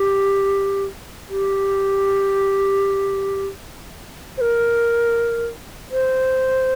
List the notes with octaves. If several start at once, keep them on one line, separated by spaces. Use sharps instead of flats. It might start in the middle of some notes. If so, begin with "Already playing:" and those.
Already playing: G4
G4
C5
A#4
C5